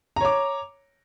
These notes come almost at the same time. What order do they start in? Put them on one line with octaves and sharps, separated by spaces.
A#5 C#5 D6